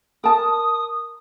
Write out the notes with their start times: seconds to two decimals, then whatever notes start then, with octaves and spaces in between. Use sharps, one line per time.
0.24 A#4 A5 D#6